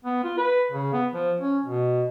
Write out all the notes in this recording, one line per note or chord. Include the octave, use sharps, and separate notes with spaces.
B3
F4
B4
C#3
B3
F3
C#4
B2